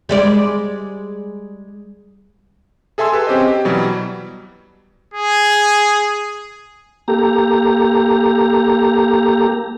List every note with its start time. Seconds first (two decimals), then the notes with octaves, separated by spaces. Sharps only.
0.09 G3 G#3 D5
2.98 G#4 A4 E5 G#5 C6 E6
3.12 G4 A4 B4
3.27 C4 C#4 G4 C5 D#5
3.48 G4
3.65 B2 E3 F#3 G3
5.14 G#4
7.08 A#3 G4 A4 A#5